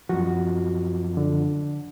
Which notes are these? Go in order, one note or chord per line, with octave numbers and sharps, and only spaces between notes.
F#2 F3 F#4
D3